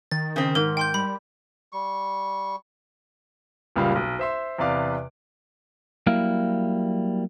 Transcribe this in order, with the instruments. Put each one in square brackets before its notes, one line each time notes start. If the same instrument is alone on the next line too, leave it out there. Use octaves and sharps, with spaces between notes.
[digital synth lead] D#3 [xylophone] A6
[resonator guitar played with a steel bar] C#3 C4
[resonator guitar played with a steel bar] G#2 [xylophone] A#4
[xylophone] G5 C6 G6
[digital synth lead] G3 [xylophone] B5
[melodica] G3 C#6
[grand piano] F#1 C#2 A#2 G3 F5
B1
C5 E5 C6
E2 C3 B4 D5 F5 D6
[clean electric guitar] F#3 G3 A#3 E4 F5